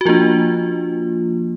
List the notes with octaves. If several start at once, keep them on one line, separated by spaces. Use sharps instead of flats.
F#4
F3 A#3 D4 F4